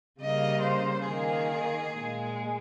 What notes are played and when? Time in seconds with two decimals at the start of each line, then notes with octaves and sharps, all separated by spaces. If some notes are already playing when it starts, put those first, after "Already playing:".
0.20 C#3 G3 A#3 D#5
0.63 C5
1.07 D#3 A#3 G#4
1.93 A#2 G#3